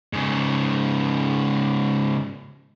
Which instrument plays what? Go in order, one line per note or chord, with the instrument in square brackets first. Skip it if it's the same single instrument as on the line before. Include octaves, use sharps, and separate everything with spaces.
[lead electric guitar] G#2 C#3